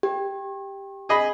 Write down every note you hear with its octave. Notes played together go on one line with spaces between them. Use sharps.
G4
G#4 D#5 B5